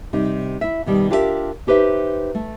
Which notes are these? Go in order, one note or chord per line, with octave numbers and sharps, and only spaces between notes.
C3 G3 D#4
E4 E5
B2 D#3 G3
D4 F4 G4 A#4 B4 E5
D#4 G4 B4 C5 E5
A3